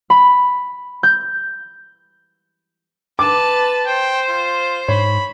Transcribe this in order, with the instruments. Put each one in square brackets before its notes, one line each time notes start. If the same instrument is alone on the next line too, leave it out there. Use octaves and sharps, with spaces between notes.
[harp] B5
G6
[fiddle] B4 A5 [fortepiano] D6
[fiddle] C5 [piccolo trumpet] G5
[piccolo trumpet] F4
[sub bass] G#2 [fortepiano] C#5 [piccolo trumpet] B5